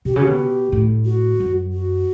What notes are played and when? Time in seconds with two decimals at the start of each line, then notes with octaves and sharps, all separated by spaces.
0.05 B2 G4
0.14 C#3 F#4
0.22 G4
0.27 B2
0.72 A2
1.05 F#4
1.40 F#2
1.73 F#4